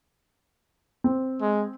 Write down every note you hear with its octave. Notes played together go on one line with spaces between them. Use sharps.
C4
G#3